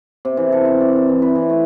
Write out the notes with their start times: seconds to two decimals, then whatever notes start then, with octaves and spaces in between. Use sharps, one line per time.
0.25 C3
0.37 E3
0.52 A4
0.65 C4
0.80 D5
0.96 A#4
1.09 E3
1.22 B4
1.35 E3
1.50 A3